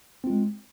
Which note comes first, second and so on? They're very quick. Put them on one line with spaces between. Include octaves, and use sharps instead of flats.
C4 F4 G#3